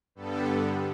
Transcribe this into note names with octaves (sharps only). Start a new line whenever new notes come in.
G2 D3 G3 B3 A4